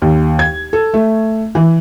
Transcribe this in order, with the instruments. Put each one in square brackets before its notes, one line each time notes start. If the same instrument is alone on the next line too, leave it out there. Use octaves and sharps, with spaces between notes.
[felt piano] D#2
G#6
A4
A3
E3